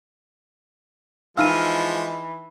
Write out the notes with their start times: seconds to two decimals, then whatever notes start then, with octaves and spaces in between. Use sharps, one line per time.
1.37 E3 F3 G#3 D#4 F5 E6 F6 D#7